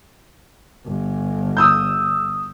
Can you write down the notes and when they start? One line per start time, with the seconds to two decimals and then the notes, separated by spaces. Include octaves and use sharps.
0.86 G1
1.57 D#6 E6 G6